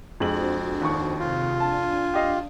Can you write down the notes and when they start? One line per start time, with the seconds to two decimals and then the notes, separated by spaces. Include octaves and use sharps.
0.20 F2 G#3 D4 F#4 C5 F#7
0.82 D#2 D#3 C#6
1.20 C3 F4
1.60 D4 G#5 A5
2.14 D4 G4 D#5 F5